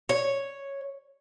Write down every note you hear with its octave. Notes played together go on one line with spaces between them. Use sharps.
C#5